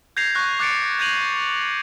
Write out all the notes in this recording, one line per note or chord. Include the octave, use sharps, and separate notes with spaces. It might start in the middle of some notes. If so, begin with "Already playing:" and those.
G6 G#6 A#6 C7 F7
C#6 F#6 A#6
D6 F#6 A6 C#7 D7
G6 G#6 A#6 D#7 F7 F#7